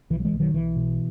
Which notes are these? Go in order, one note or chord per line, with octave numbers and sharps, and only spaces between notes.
B1 E3
F#3
E3 G#3
B1
D#3 F#3
B1 E3
B2